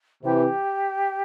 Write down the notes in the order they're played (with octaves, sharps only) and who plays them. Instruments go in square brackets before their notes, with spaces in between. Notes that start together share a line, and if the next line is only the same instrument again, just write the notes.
[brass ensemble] C3 E3 [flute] G4